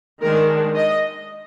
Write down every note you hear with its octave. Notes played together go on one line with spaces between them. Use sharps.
D#3 G#3 D4 A#4
D#5